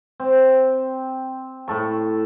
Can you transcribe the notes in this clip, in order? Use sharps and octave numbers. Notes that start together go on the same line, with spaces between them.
C4
A2 A4 C#6